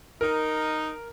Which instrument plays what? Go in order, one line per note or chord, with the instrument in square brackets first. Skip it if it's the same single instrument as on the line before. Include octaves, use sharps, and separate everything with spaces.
[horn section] D#4 [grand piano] A#4